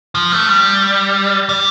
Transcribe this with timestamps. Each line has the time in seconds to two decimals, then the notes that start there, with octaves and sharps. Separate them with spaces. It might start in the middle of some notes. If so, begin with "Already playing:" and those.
0.15 F3
0.32 A3
0.49 G3
1.49 G3